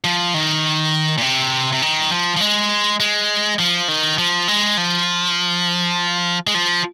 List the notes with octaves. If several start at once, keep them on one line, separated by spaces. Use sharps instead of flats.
F3
D#3
A#2
C3
C3
D#3
F3
F3
G#3
G#3
F3
D#3
F3
G#3
F3
G#3
F3